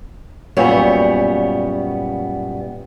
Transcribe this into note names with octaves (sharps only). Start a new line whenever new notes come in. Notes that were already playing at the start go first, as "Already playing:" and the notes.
F#2 A#2 G3 B3 C#5